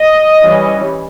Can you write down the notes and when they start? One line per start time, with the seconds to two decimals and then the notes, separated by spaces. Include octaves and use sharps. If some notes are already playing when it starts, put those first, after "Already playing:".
Already playing: D#5
0.43 E3 G3 C#4